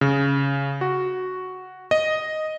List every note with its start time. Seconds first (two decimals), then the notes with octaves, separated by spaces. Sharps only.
0.01 C#3
0.81 F#4
1.91 D#5